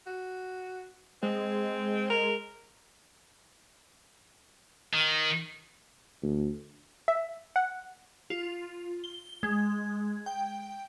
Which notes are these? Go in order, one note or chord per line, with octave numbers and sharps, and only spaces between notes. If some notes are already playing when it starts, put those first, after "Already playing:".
F#4
G#3 C4
A#4
D#3
D2
E5
F#5
F4
G7
G#3
G5